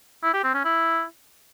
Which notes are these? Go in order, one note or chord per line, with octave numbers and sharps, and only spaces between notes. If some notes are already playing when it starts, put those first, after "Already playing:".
E4
G4
C4
C#4
E4